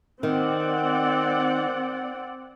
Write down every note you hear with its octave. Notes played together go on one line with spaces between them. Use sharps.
D#3 C4 D5 F#5